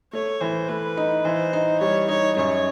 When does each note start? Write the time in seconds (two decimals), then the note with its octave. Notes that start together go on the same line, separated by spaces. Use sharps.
0.13 A3 C#5
0.41 E3 C5
0.69 A3 B4
0.97 D#4
1.25 E3 C5
1.53 D#4
1.80 G3 C#5
2.09 D#4 C#5
2.37 F#2 C#5